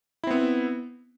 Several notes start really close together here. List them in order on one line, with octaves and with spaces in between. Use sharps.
E4 C4 B3